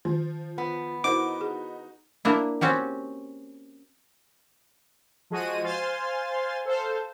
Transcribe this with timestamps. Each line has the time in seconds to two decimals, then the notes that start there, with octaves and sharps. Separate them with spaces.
0.05 D#3 F3
0.58 B3
1.04 D#4 E4 F#4 A#4 C5 D6
1.41 G#4
2.25 A#3 D4 E4
2.61 C4 C#4 F#4 G4
5.30 F3 G#3 F#4 D#7
5.64 C5 F5 G#5 C6 F6 A6
6.65 A4 C5 F5